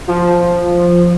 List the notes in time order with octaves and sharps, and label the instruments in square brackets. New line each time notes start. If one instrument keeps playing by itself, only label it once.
[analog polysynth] F3